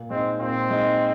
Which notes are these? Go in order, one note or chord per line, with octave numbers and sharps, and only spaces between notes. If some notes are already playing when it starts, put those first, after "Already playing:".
Already playing: A#2
G#3 C4 D#4
A#2 C4
G#3 D#4